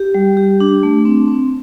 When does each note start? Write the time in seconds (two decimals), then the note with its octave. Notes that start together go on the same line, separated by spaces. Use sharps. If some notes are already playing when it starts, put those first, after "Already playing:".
Already playing: G4
0.15 G3
0.37 G4
0.60 D4
0.83 A3
1.05 C4
1.28 C4